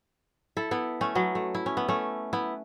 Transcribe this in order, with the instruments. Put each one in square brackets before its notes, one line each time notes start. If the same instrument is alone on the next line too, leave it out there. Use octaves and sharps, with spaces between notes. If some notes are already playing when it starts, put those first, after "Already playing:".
[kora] E4 A4
B3 E4
A3 C#4
F#3 B3
A3
E4
C#4
B3
A3 C#4
B3 E4